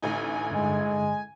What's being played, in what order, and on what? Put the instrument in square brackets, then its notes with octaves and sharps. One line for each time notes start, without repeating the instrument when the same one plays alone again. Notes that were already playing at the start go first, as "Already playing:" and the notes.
[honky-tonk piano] A1 D2 D#4 [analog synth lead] G#5
[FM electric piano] G2 D3 [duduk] G#3